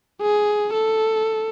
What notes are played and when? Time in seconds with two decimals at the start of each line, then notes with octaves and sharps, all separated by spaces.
0.22 G#4
0.73 A4